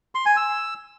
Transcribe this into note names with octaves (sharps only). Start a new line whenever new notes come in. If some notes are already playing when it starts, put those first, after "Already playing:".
C6
G#5
E6